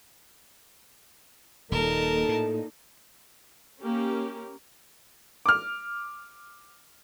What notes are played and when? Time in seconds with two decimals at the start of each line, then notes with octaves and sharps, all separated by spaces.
1.72 D#1 A#2 D#4 A4 A#4 A5
2.29 A2
3.82 A#3 C#4 G4 A#4
5.46 D6 F6